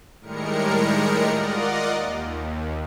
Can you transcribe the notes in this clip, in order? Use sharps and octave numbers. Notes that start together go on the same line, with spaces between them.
A2 D#3 G3 G#3 A#4 C#7
F4 A#4 D5 D#5 F#5
D#2